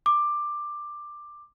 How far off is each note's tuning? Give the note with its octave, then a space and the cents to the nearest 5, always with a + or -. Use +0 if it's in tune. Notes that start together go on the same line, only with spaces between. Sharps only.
D6 +10